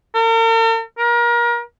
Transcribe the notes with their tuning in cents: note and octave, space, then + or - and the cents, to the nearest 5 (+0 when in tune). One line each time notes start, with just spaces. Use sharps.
A#4 -45
A#4 +30